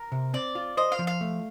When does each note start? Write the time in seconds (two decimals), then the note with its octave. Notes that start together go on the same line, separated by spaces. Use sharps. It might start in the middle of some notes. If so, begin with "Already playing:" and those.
Already playing: A#4
0.12 C3
0.34 C4 D5
0.55 F4
0.77 C5 D#5
0.92 F5
0.99 F3
1.07 F5
1.21 A3